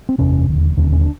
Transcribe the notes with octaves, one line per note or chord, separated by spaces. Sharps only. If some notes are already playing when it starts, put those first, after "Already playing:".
C4
F#1 E2 C3 C#4
E1 D#2 D3
E1 D#2 D3 C#4
C#4
D4